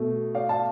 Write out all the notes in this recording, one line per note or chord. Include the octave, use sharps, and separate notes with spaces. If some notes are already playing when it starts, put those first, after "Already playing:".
Already playing: B2 A3
D5 F5
F5 A5